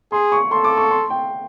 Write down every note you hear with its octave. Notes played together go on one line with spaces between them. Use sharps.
G#4 C6
C#6
A4 C6
D6
C#6
C6
G5